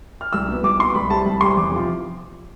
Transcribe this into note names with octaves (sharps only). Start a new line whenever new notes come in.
F6
C2 E6
B2 B3
C2 D6
B2 B3 C6
C2 B5
C3 G3 A5
C2 B5
C3 G3 C6
E2 D6
C3 F3